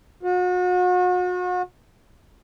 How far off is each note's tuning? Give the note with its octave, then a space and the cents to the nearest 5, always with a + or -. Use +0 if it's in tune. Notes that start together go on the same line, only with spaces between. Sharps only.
F#4 -40